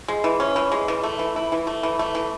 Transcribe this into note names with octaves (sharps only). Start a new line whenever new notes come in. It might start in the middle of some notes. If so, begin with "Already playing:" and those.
G#3
E3
C#4
E3
G#3
E3
A3
E3
E4
E3
A3
E3
A3
E3